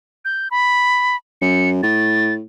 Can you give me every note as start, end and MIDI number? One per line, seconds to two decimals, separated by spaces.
0.25 0.48 91
0.51 1.16 83
1.42 1.78 42
1.42 1.70 97
1.83 2.43 45
1.83 2.34 93